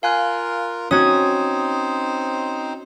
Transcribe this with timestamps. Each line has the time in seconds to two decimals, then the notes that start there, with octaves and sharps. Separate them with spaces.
0.03 F4 A#4 F5 G#5 F#6
0.91 C4 C#4 D#4 F#4 C5 D#6 G#6